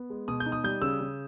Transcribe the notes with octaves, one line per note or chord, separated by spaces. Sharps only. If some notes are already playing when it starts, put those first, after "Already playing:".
Already playing: B3
G#3
B2 D#6
G6
D#4
D#6
G3 G6
C#3 E6
C#3